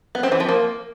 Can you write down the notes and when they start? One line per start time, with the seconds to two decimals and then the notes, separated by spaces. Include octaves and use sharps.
0.15 B3
0.23 C4
0.32 E3
0.40 F3
0.49 A#3